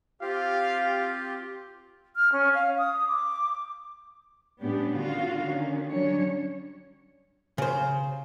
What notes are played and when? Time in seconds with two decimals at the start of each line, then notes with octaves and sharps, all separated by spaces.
0.21 C4 F4 G4 F5
2.16 F6
2.32 C#4
2.54 F5
2.78 D#6
3.07 D6
4.61 A2 G3 B3 C#4 D4 G4
4.96 D3 D#3 F4 F#4 F5
5.44 D3 D#3 A#3 C#4
5.92 F#3 G3 C#4 D4 C#5
7.58 C#3 C5